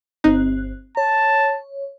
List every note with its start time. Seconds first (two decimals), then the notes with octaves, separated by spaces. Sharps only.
0.24 G1 C4 D#4 F#6
0.97 C#5 A5